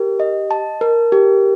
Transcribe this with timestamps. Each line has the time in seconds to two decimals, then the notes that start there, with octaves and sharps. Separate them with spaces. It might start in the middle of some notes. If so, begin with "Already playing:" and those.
Already playing: G4 A#4
0.20 D#5
0.51 A5
0.81 A#4
1.12 G4